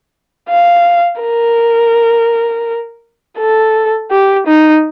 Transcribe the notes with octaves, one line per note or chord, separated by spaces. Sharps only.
F5
A#4
A4
G4
D#4